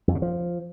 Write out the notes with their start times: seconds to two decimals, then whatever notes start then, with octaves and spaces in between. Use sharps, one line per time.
0.08 F2
0.15 C#3
0.22 F3